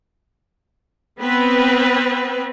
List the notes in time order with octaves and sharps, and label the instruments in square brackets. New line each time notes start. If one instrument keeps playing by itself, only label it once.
[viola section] B3 C4 B4